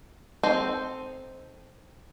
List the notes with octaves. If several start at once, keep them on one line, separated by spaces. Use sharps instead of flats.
C4 D#4 A4 C5